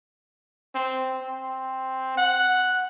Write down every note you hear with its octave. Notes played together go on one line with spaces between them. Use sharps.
C4
C4
F#5